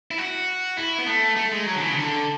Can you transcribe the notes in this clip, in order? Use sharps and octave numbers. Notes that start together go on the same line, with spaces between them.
E4
F#4
E4
B3
A3
A3
G#3
F#3
D3
E3
C#3
D3